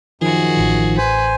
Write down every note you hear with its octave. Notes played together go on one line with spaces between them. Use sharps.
F#2 D#3 F3 F#4 G#4
A1 E3
B4 C5 G#5